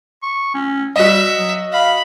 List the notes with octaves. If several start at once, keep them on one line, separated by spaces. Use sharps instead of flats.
C#6
C#4
G3 F#4 D#5 E5
F#3
F5 B5